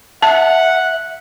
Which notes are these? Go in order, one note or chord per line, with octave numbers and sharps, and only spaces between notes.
E5 F#5 A5